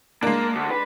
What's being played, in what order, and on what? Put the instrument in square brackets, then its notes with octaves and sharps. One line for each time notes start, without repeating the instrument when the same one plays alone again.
[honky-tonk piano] G#3 D4 [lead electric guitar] A#3
[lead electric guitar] D2
B4